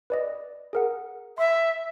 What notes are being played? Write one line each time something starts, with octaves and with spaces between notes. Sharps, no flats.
B4 D5 D#5
G#4 A#4 F#5
E5 C6